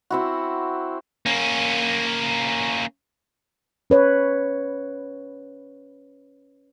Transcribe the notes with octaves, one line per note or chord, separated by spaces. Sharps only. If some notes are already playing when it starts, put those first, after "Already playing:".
C4 E4 F#4
A#3 C#4
C#4 B4 C#5